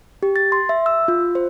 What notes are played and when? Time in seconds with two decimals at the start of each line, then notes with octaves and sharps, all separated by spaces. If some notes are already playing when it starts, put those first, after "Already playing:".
0.23 G4
0.36 A6
0.52 C6
0.69 E5
0.86 E6
1.08 F4
1.35 C5